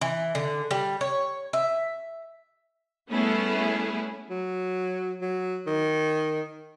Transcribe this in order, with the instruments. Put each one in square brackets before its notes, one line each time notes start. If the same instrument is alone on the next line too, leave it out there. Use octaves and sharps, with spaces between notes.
[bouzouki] E3
D3
G3
C#5
E5
[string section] G3 A3 B3 C#4 E4 G#4
[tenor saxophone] F#3
F#3
D#3